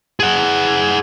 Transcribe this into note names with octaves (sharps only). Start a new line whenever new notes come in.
G#4 F#5